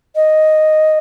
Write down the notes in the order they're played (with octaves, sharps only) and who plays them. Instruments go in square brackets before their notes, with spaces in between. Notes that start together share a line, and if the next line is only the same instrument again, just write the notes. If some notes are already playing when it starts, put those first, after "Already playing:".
[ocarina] D#5